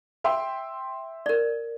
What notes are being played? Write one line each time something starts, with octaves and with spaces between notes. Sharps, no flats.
E5 G5 C6
A#4 D5